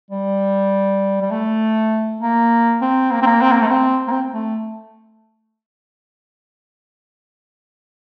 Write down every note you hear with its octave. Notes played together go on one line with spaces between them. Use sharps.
G3
G3
A3
A#3
C4
A#3
C4
A#3
C4
A#3
A3
A#3
C4
A#3
C4
A3